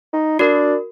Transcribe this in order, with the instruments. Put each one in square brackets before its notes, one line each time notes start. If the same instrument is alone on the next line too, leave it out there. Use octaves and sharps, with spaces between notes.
[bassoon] D#4
[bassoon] D4 [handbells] F#4 A#4